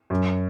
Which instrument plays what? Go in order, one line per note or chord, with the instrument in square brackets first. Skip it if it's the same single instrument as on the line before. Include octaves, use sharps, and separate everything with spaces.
[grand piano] F#2